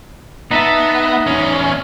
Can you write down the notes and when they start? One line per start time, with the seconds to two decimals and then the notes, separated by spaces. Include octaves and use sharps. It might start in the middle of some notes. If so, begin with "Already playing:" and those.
0.51 B3 D#4 E5 A5
1.27 E2 C#4